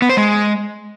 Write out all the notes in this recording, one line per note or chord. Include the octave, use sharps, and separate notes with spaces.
B3
C5
G#3